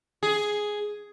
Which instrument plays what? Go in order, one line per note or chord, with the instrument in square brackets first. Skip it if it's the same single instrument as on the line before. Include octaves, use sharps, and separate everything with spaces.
[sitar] G#4